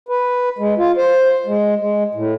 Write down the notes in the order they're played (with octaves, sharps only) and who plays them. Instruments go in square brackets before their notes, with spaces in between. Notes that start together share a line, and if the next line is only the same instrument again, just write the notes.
[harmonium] B4
G#3
F4
C5
G#3
G#3
A2